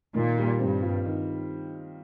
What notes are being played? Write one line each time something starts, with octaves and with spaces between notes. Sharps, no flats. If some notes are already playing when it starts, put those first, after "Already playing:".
A#2 D#3
G3
G2 C4
F4
D#3